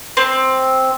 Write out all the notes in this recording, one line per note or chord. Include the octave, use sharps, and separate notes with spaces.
C4